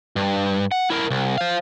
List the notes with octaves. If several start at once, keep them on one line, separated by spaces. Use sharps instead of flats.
G2
F#5
E4 A#4
C2
C5 F5